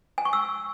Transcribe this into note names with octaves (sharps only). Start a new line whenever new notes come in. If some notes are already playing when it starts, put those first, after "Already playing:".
G#5
C#6
E6